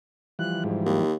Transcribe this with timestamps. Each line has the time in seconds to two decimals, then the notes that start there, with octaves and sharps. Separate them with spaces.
0.39 E3 F3 G3 F#6
0.64 G#2
0.85 D#2